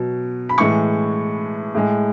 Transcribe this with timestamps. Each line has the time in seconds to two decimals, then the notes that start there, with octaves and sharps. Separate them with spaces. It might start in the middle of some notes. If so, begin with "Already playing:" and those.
Already playing: B2 F#3
0.49 B5
0.58 A2 E3 G#3 C#6
1.75 A2 G#3